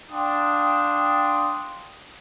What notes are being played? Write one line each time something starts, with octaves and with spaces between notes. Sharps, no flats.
D4 F5 G5 A5 C6 D#6